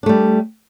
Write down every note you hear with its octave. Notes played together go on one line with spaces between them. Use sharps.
G3 A3 D4